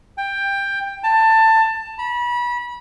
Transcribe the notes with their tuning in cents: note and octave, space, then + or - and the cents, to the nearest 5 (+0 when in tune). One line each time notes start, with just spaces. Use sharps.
G5 +15
A5 +20
B5 -30